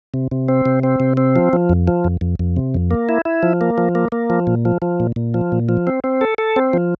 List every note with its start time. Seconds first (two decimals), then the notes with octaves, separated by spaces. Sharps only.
0.14 C3
0.31 C3
0.48 C4
0.66 C3
0.83 C4
1.00 C3
1.17 C4
1.36 F3
1.53 F3
1.70 F2
1.88 F3
2.04 F2
2.21 F2
2.39 F2
2.57 C3
2.74 F2
2.91 A#3
3.09 E4
3.25 E4
3.43 F3
3.61 A#3
3.78 F3
3.95 A#3
4.12 A#3
4.30 F3
4.47 A#2
4.65 F3
4.82 F3
5.00 A#2
5.16 A#2
5.34 F3
5.52 A#2
5.69 F3
5.87 C4
6.04 C4
6.21 A4
6.38 A4
6.56 C4
6.73 F3